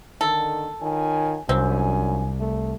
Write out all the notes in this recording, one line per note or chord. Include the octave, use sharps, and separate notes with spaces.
D3 D#3 A4 A#4
D#3 F4 C#5 G#5
C2 F#2 F3 C4 D4 G#5
A3